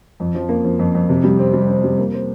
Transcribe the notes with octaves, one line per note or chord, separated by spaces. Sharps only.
F2
F3
A#3
F3
F2
F2
C3
G3
C4
G3
C4
G3
A#3
C5